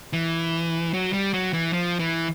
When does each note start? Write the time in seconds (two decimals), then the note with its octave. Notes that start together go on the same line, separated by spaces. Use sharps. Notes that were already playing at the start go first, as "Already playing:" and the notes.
0.13 E3
0.94 F#3
1.13 G3
1.34 F#3
1.53 E3
1.73 F3
1.99 E3